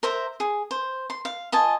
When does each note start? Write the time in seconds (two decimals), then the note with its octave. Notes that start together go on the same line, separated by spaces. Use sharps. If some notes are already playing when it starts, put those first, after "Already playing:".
0.03 A#4 C5 E5 A#5
0.40 G#4
0.71 C5
1.10 C6
1.25 F5
1.52 F4 D#5 G#5 A5